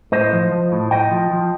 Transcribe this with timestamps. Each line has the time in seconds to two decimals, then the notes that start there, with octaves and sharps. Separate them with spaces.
0.12 A2 C5 D#5
0.33 F3
0.52 F3
0.72 A2
0.91 A2 D#5 G5
1.11 F3
1.31 F3